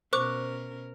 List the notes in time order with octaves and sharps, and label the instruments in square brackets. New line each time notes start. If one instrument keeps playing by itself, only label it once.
[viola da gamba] B2 C#4 A#4 [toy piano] C5 [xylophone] C#6 D6 F#6